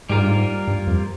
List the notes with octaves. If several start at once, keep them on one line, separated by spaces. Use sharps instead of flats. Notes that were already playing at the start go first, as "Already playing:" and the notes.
G#2 G3 A#3 F4 A#4
G2
G#2
G2
F2